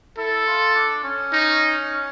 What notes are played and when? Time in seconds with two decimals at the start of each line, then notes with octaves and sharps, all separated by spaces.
0.18 E4 A4
0.47 F4
0.75 D4
1.04 C#4
1.33 D#4